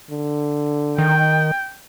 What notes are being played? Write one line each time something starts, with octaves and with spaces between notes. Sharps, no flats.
D3
D#3 G5